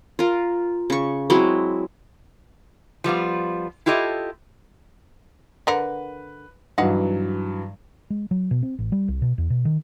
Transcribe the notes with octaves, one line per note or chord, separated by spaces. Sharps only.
F4 A#4
C#3 C#6
F#3 G#3 C4 E4
F3 G3 B3 F4
E4 F4 G4 A4 D#5
D3 A#4 B4 F#5
G2 E3 F#3 D#4 F5 F#5
G#3
F#3
B2
C4
A1
G3
C2
B2
E2
B2
D#3